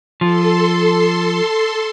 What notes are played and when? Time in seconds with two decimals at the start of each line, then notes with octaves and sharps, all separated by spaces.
0.21 F3 A4 C6